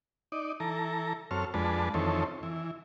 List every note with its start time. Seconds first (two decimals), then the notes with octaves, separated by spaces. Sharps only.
0.32 D#4 D5
0.60 E3 A4 A#5
1.31 F#2 C4 A4 C#5 F6
1.54 F2 G#3 D4 B4 A5
1.94 F2 D#3 E3 C4 A4 C#5
2.43 E3